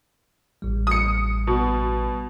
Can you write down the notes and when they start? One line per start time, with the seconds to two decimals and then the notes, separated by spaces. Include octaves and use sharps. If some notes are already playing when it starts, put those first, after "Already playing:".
0.62 A1 G3
0.87 D#6 C#7
1.47 B2